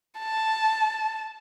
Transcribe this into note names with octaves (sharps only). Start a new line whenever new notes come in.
A5